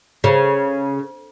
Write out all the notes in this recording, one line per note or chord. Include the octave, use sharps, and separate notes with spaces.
C#3